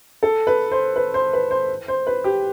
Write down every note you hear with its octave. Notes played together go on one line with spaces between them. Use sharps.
A4
B4
C5
B4
C5
B4
C5
C5
B4
G4